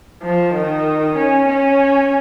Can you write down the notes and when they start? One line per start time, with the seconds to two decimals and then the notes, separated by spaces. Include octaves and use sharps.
0.23 F3
0.54 D#3
1.17 C#4
1.48 C#4